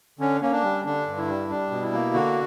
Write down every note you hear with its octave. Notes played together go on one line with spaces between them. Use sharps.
D3 C#4
A#3 C#4
D4
G3
D3 D4
G2
E4
G3
G3 D4
B2
E4
A#3
D3 F#4